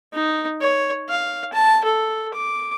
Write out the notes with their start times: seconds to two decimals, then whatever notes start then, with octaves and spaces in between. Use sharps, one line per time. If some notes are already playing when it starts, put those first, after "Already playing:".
0.13 D#4
0.61 C#5
1.09 F5
1.53 A5
1.85 A4
2.34 D6